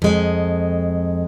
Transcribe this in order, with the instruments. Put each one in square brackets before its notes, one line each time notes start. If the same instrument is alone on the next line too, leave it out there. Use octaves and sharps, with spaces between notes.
[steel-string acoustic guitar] F2 G#3